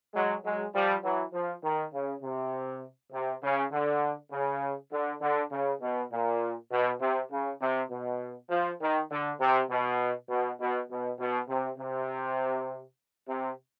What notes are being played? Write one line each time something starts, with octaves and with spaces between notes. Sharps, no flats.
F#3 G#3
F#3 G#3
F3 G3
E3 F#3
F3
D#3
C#3
C3
C3
C#3
D3
C#3
D3
D3
C#3
B2
A#2
B2
C3
C#3
C3
B2
F3
D#3
D3
C3
B2
B2
B2
B2
B2
C3
C3
C3